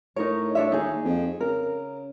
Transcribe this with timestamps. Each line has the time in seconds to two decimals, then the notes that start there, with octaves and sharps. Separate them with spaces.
0.16 A2 D#4 A#4 C#5
0.55 D4 C#5 E5
0.72 D#2 D#4 G#4
1.05 F2
1.41 C#3 A#4